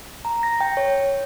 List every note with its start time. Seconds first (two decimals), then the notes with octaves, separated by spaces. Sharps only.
0.25 A#5
0.43 A#6
0.61 G5
0.77 C#5